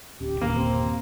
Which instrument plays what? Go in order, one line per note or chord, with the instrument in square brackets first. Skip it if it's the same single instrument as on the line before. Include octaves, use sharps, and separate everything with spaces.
[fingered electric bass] D1 C#4 [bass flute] G4
[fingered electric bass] G1 D#2 A#2 [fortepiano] A#3
[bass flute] C4